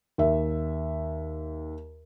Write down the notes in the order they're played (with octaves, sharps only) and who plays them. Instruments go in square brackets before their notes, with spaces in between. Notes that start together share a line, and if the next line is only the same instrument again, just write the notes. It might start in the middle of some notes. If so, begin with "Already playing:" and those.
[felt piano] D#2 E5